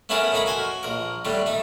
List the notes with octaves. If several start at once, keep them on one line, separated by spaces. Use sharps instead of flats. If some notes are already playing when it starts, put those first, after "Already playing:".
A3 B3 C#4 E4 G#4 A#4
A2 D#4 A#4 B5
F#4 G#5 C6
A#1 A#4
A2 D3 G3
A3 D#4